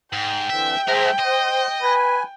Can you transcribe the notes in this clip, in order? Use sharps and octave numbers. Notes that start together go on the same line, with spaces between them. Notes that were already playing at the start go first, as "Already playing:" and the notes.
G#2 G5
D3 E3 C4 E5
A3 G#4 A#4 C5 E5
C5 D#5
B4 G#5